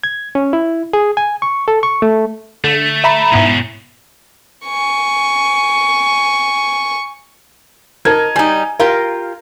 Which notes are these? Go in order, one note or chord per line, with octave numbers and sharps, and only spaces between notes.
G#6
C#4
E4
G#4
G#5
C#6
A4
C#6
A3
D3 A3
E5 A#5 B5
G#2 B2 B3 C#4 E4
G#5 C#6
D#4 A#4 A5 G#6
G3 D#4 G#5
F4 G4 A#4 F5